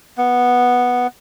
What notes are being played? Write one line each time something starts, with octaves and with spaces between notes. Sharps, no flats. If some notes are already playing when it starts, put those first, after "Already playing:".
B3